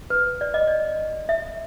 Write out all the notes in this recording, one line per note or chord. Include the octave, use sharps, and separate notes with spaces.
B4
D5
D#5
D5
E5